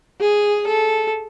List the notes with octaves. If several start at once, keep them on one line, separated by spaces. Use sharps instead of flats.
G#4
A4